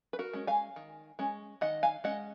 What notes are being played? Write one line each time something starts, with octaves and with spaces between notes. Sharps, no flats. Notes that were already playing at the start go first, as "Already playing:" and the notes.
B4
F#4 A#4
G#3 C#4
F5 G#5
D#3
G#3 C#4
D#3 D#5 F#5
F5 G#5
G#3 C#4 D#5 F#5